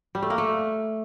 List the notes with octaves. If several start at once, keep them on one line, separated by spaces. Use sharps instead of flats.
G3
A3
A#3
A3